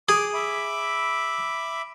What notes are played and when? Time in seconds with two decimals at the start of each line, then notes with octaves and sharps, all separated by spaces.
0.09 G#4 D6
0.34 E5 B5 D6